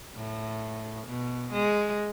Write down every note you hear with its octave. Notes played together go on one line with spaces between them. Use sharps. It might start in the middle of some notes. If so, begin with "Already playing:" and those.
A2
B2
G#3